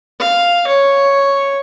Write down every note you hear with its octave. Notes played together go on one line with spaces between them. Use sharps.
F5
C#5